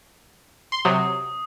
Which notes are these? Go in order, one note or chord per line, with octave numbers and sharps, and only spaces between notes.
C6
C3 F#3 D#6